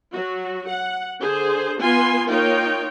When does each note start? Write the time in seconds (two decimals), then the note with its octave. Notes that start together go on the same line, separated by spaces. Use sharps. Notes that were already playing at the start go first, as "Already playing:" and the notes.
0.12 F#3 F#4
0.68 F#5
1.21 D3 G#4 C5
1.81 B3 F4 G#5 C6
2.29 A#3 D#4 F4 C#5 G5